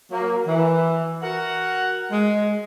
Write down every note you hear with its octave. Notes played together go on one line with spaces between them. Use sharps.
F#3 A#3
E3
F#4 A#4 F#5
G#3